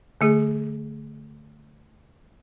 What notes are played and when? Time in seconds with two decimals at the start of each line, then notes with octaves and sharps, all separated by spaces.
0.21 D3 A3 G#4